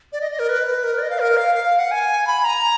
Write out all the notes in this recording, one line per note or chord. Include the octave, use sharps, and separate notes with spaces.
D5
D#5
D#5
A#4
B4
B4
A#4
B4
D5
D#5
F5
A#4
F5
F5
F#5
G#5
B5
A#5